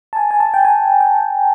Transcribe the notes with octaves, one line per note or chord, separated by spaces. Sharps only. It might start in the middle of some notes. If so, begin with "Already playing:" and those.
A5
G#5
G#5
A5
G5
G#5
G5